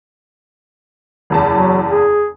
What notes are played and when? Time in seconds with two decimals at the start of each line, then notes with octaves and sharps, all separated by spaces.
1.30 F#1 E2 A5
1.52 F#3
1.91 G#4